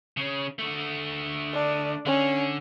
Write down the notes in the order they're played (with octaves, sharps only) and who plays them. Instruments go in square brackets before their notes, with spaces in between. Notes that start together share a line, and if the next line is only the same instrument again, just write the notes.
[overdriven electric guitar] C#3 C#4
D3 A3
[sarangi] D4
[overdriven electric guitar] D3 [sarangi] C#4